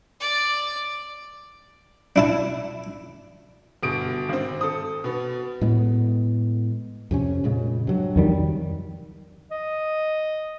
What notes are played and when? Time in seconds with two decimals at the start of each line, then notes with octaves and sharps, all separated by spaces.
0.20 D5
2.16 D4 E4 A5
3.83 G1 B2 D#6 D7
4.29 G#1 C4
4.61 A4 D#6
5.04 B2 B3
5.61 A2 G#3 B3
7.11 F2 C3 C#4
7.44 A#2 C#3 G#3
7.87 G2 F#3
8.16 F2 D#3 G3
9.51 D#5